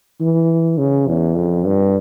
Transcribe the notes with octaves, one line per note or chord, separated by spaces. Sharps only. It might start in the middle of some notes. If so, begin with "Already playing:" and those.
E3
C#3
E2
F2
G2